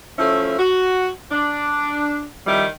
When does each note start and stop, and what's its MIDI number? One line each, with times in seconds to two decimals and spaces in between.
0.17 0.56 53
0.17 0.56 57
0.17 0.56 61
0.17 0.56 64
0.58 1.06 66
1.31 2.24 62
2.46 2.65 41
2.46 2.65 51
2.46 2.65 55
2.46 2.65 64